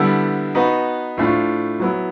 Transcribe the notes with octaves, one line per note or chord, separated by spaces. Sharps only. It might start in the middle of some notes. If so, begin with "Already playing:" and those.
Already playing: D3 G3 B3 E4 A4
B3 D#4 F#4 B4
A2 F3 A3 D4 F4
F#3 B3 E4